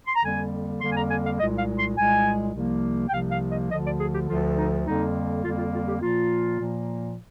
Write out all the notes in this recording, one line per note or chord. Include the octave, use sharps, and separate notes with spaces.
C6
A#5
F2 D3 G3 A#3 G#5
F2 D3 G3 A#3 C6
G#5
A#5
G#5
F5
C2 A#2 G#3 D#5
F5
C6
C2 A#2 G#3 G#5
C2 C3 F3 A#3
G5
C2 C3 F3 A#3 F5
F5
D#5
D2 D3 F3 D#5
D5
G#4
G4
D2 D3 F3 F4
D#4
F2 D3 G3 A#3 D#4
F2 D3 G3 A#3 F4
F4
F4
G4
A#2 F3 A#3 F4
A#2 F3 A#3